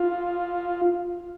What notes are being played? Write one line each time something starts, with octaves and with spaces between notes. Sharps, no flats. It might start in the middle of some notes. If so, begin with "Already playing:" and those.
Already playing: F4